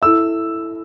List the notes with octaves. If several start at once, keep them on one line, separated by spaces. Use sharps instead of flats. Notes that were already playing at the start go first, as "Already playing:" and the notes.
E4 A4 E5 E6